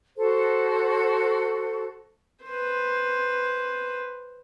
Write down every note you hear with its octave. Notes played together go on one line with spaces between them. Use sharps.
F#4 A4 C5
B4 C5